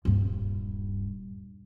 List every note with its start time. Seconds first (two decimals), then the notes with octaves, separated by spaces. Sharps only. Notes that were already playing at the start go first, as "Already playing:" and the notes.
0.05 D#1 G2